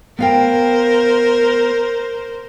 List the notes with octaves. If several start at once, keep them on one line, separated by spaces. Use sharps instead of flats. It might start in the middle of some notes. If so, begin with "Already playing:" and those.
B3 A#4 C5 F5 G5